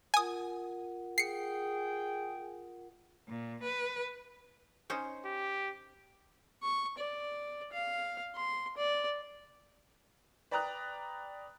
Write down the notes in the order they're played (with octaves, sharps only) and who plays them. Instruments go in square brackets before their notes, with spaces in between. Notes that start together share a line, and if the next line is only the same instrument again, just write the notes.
[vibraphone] F4 A#4 F#5 [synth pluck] G#5 D#6
[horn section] G#4 G5 [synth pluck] C7 C#7
[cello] A#2
B4
[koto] C#4 D#4 C5
[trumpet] G4
[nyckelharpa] C#6
D5
F5
C6
D5
[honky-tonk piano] B4 D5 G5 A#5 D#6 F#6